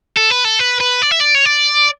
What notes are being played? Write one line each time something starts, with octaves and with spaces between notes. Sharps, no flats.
A4
B4
A4
B4
B4
D5
E5
D5
C#5
D5